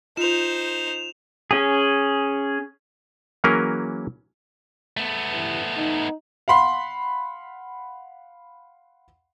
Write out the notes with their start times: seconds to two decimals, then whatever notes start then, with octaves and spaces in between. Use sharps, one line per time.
0.17 D#4 F4 C5 E7 F7
1.51 C#4 G#4
3.44 E3 F#3 A#3 C#4 G#4 A#4
4.97 A3 B3
5.30 G2 E3
5.77 D#4
6.48 F5 F#5 B5 C6